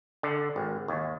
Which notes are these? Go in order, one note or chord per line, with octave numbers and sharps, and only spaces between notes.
D3
G#1
D#2